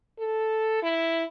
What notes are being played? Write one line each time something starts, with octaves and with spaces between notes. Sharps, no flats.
A4
E4